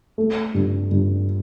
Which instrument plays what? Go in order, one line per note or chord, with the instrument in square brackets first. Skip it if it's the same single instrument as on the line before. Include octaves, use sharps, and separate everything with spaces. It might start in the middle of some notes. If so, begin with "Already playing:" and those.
[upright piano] A3
G2
G2